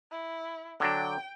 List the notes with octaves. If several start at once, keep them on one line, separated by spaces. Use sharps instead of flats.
E4
D3 F#3 D4 G5